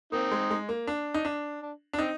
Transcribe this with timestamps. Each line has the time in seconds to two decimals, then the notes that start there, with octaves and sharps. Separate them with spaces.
0.12 A#3 C4 D#4
0.31 G#3
0.50 G#3
0.69 A#3
0.87 D4
1.14 D#4
1.25 D4
1.61 D4
1.93 D4
1.98 C4 D#4